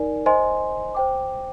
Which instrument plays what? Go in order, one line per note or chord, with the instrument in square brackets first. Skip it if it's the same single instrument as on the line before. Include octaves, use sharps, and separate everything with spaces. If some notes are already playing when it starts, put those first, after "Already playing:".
Already playing: [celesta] D#4 A#4 D5 G#5
C5 D#5 G#5 C6
C5 G5 D6